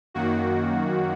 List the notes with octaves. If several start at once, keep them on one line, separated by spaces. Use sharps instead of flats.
F#2 D#3 A#3 F#4